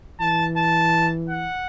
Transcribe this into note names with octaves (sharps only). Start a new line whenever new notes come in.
E3 A5
A5
F#5